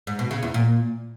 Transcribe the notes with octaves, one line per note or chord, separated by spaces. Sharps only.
G#2
B2
C#3
E2
A#2